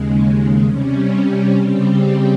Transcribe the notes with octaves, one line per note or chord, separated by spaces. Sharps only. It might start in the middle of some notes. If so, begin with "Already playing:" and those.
Already playing: D#2 C#3 G#3
C3 G3 C#4
C#3 G3 C4 G4